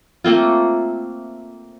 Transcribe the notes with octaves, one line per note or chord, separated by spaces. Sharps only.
A3 A#3 C4 F4